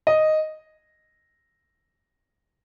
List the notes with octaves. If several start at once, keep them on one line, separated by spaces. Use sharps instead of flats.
D#5